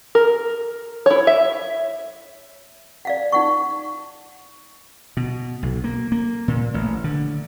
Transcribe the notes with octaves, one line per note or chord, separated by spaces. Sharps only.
A#4
E4 C#5
E5
D5 F5 F#5
D#4 F#5 C#6
B2
B1
A#3
A#3
A#2
A1
D3